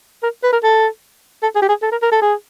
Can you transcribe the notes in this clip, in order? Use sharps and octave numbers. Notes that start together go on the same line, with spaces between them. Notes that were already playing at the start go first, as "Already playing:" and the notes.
A#4
B4
A#4
A4
A4
G#4
G4
G#4
A4
A#4
A#4
A4
G#4